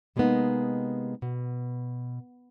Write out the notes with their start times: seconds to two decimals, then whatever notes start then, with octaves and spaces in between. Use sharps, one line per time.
0.16 C3 G3 G#3 A#3 B3 D#4
1.22 B2